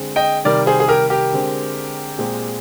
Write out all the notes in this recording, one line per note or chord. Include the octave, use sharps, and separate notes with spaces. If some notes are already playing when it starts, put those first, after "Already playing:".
Already playing: D3 G#3 C4
D#5 G5
C3 D#3 G3 A#4 D5
G#4 C5
G#4
G4 A#4
G4 A#4
D3 G#3 C4
A#2 G#3 C4